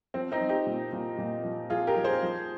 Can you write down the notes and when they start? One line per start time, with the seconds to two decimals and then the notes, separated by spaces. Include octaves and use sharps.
0.14 F3 C4
0.32 C4 D#4
0.40 F3
0.49 D#4 G4
0.66 A#2
0.93 A#2
1.18 A#2
1.44 F3
1.70 F3 F4 G#4
1.87 G4 A#4
1.96 F3
2.04 G#4 C5
2.22 F3